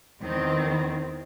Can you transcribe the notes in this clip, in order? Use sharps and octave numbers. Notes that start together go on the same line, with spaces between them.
E2 D#3 C4